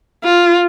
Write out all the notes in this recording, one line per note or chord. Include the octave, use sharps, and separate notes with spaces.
F4